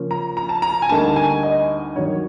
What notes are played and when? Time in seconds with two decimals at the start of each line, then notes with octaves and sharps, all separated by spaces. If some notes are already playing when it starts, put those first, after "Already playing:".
Already playing: C#3 F3 A#3 C#4
0.11 A#5
0.37 A#5
0.49 A5
0.62 A#5
0.82 G#5
0.89 D2 D3 G3 A#3 D#4 A5
1.16 G#5
1.43 D#5
1.95 G2 D#3 F#3 A#3 C#5